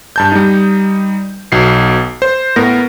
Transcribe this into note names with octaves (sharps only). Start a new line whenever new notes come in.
G2 A5 G6
G3 D#4
B1 B2 C7
C5
A2 B3 A#4 A#6